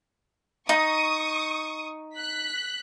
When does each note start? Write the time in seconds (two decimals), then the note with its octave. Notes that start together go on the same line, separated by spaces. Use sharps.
0.69 D#4 C#6 D#6
2.14 F#6 B6